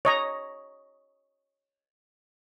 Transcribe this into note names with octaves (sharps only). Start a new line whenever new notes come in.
C#5 D#5 A#5